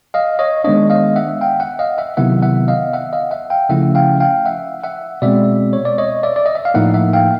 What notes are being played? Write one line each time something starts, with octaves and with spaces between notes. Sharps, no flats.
D#5 F5
C#5 D#5
D#3 G#3 B3 D4 C#5 D#5
D#5 F5
E5 F#5
F5 G5
E5 F#5
D#5 F5
E5 F#5
C3 D#3 F#3 B3 E4 E5 F#5
E5 F#5
D#5 F5
E5 F#5
D#5 F5
E5 F#5
F5 G5
C#3 F3 A3 C#4 E4 E5 F#5
F5 G5
F5 G5
E5 F#5
E5 F#5
B2 G#3 C4 D5 E5
C#5
D5
C#5 D#5
D5 E5
D5
D#5
E5
F5
A2 F3 A#3 D#4 E5 F#5
E5 F#5
F5 G5